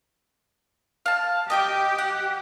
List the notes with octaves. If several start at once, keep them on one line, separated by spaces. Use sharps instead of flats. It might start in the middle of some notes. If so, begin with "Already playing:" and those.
F5 A5
G4 D#5 G5 D6
F#5